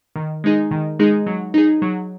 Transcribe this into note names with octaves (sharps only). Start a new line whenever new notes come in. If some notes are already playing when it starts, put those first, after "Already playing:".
D#3
G#3 D#4 G#4
D#3
G#3 D#4 G#4
F#3
D#4 G#4
F#3